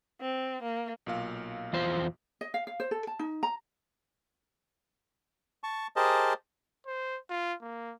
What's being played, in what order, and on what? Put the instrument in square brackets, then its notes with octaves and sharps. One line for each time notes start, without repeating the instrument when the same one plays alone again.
[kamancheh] C4
A#3
[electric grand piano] B1 A#2 F5
[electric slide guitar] E2 F4 C5
[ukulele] D#5
F5
F5
C5
A4
A5
D#4
A#5
[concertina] A5 C#6
G4 G#4 A#4 C5 D#5 A5
[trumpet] C5
F4
A#3